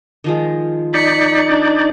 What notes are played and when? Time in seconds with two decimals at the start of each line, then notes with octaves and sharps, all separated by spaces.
0.24 D#3 F3 G#3
0.94 D#4 D5 B6 C#7
1.49 D4